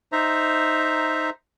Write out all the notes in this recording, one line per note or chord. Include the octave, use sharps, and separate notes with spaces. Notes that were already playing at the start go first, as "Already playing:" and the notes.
D#4 C5 E5 A#5